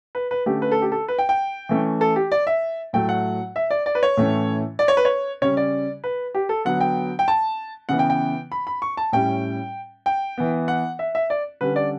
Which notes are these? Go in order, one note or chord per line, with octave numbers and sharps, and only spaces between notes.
B4
B4
D3 A3 C#4 G4
B4
A4
G4
A4
B4
G5
G5
E3 A3 C#4
A4
G4
D5
E5
A2 F#3 A3 G5
F#5
E5
D5
D5
B4
C#5
A2 E3 A3 C#4
D5
C#5
B4
C#5
C#3 G3 C#4 C#5
D5
B4
G4
A4
D3 F#3 B3 F#5
G5
G5
A5
C#3 E3 B3 F#5
G5
G5
B5
B5
C#6
A5
A2 G3 C#4 G5
G5
E3 B3
F#5
E5
E5
D5
D3 G3 C#4 B4
D5